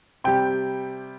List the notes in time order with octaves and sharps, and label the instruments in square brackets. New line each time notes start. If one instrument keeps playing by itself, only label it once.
[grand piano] C3 G3 G5